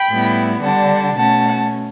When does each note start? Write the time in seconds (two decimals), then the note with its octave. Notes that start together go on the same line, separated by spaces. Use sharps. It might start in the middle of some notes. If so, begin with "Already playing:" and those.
Already playing: G5 B5
0.09 A2 G3 B3 E4
0.63 D3 G3 D4 F#5 A5
1.16 B2 A3 C#4 F#5 A5